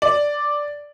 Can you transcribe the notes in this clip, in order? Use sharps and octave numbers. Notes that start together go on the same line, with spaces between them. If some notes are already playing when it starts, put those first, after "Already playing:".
D5